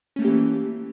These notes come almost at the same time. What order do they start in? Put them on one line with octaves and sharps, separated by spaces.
C#4 A3 A#3 G4 E3